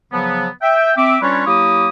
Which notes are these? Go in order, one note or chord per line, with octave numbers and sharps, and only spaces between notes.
C#3 F3 F#3 B3
E5 G5
C4 E5 D6
G3 C#4 D4 F4 B4 C#5
F#3 A#3 E4 G4 D#6